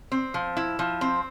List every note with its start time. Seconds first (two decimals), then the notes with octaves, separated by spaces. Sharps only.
0.12 C4
0.34 F3
0.57 E4
0.79 F3
1.01 C4